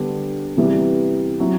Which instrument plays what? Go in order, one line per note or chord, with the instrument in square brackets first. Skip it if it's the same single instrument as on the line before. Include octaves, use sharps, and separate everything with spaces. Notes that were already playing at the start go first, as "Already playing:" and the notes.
Already playing: [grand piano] D3 G3 B3 D4
C3 E3 G3 B3 E4
F#3 C4 E4